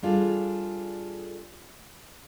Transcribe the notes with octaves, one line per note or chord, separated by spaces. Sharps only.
G3 D4 F4 G#4 A4